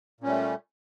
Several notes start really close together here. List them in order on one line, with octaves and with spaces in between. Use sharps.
A#2 C#4 G3 A3